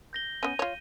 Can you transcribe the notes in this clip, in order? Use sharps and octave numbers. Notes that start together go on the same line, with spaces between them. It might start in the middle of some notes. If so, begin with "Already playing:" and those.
G6 A#6 G7
B3 C#4 D#7
F4 C#5